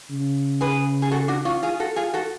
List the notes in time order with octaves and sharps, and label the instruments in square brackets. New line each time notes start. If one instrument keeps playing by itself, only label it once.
[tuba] C#3
[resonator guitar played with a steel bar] G#4 B4
G#4
F#4 A4
D4 F#4
C#4 F4
F4 G#4
F#4 A4
F4 G#4
F#4 A4